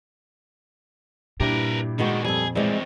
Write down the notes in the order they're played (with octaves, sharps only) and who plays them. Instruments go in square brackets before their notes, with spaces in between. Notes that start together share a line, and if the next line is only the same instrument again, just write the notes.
[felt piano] G2 E4 G4 [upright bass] A#2 [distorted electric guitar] A#4 B4
[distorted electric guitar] D3 D#3 [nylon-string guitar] G#3 B3 F#4
[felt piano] F2 [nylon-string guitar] G3 A4 [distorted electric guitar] G#4
[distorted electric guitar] F2 A2 [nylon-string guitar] E3 G#3 [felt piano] C4 D5 D#5